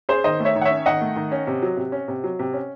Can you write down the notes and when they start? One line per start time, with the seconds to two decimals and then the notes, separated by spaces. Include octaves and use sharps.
0.09 C#4 G#4 C5
0.24 D#3 C5 D#5
0.40 A3
0.45 C#5 E5
0.55 D#3
0.61 F#5
0.65 C#5 E5
0.71 C#4
0.86 D#3 D#5 F#5
1.01 A3
1.16 D#3
1.32 C#4
1.47 C3
1.63 F#3
1.77 C3
1.92 C#4
2.08 C3
2.24 F#3
2.39 C3
2.53 C#4